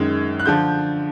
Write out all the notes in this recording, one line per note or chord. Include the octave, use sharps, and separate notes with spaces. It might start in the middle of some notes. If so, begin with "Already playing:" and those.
Already playing: F#2 D#3 G#3 G#6
F#6
D3 F3 G6